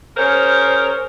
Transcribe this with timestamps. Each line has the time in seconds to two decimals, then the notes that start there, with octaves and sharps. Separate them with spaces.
0.17 C#4 G#4 A#4 C5